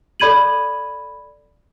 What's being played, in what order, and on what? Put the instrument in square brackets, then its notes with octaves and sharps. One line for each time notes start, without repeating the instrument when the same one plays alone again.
[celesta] A4 D5 B5 G#6 D#7 F#7